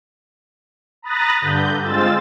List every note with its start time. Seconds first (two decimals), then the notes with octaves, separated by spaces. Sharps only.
1.02 A#5 B5 D#6 F#6 A6 A#6
1.41 G2 D3 G6
1.83 G#3 C4 F4 E6 A6